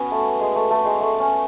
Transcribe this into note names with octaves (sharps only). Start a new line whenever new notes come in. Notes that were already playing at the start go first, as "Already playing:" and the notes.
Already playing: B3 C#4 F#4
A3
G#3
A3
A3
G#3
A3
C#4